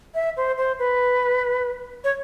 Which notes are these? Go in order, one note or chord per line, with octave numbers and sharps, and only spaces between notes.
E5
C5
C5
B4
C#5